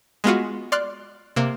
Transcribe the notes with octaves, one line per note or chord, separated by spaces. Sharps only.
G#3 B3 F4 F#4
D5 C6 F6 F#6
C3 A#3